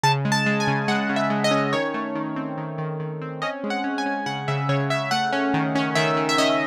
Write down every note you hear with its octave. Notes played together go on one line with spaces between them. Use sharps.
C#3 A5
G#3
A5
G#3
G#5
C#3
G#3 F#5
C#3
E5
G#3
D#5
C#4
D#3 C#5
A3
D#3
C4
D#3
D#3
D#3
C4
C#4 D#5
G#3
F#5
C#4
G#5
C#4
C#3 F#5
C#3 E5
C#3 C#5
C#3 E5
A3 F#5
C#4
D#3
C#4
D#3 E5
D#3
E5
C#4 D#5